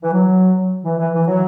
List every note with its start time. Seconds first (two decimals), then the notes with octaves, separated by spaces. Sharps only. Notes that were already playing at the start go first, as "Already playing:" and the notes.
0.03 E3
0.12 F#3
0.84 E3
0.98 E3
1.14 E3
1.27 F#3